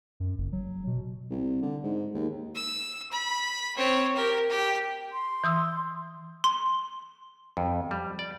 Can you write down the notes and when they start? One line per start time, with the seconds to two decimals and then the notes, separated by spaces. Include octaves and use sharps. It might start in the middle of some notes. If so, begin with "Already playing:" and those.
0.20 F#2
0.38 F#1
0.52 F#3
0.87 B2
1.30 C2
1.62 D3
1.84 G#2
2.14 D#2
2.55 E6
3.12 B5
3.76 C4 C#5
4.16 G4 A#4
4.49 G4
5.12 C6
5.44 E3 D#6 E6
6.44 C6
7.57 F2
7.91 G3
8.19 D5